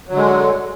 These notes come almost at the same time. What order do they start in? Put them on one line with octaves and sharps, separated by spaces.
F#3 D3 G#3